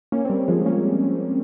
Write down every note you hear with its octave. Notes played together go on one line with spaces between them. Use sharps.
A#3 C#4
C4
G3 A#3
F3 G#3
A#3 C#4